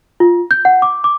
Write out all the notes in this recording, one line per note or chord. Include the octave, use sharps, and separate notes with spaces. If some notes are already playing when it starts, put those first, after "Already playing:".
F4
G6
F#5
D6
D6